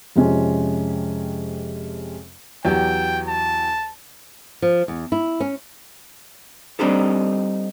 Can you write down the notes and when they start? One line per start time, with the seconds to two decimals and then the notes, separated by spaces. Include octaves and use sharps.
0.16 F2 C3 G#3 C#4
2.65 E2 F#3 G4 G5
3.27 A5
4.62 F3
4.88 E2
5.12 E4
5.40 C#4
6.79 G3 C4 D4 D#4 G4 A4